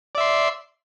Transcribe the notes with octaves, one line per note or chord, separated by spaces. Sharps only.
D5 E5 C6